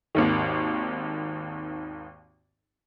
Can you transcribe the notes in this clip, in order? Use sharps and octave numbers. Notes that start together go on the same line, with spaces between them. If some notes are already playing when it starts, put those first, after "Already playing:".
G#1 D#2 D#3